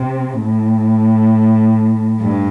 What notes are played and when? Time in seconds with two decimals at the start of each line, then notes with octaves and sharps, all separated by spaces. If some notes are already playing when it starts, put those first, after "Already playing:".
Already playing: C3
0.40 A2
2.20 G2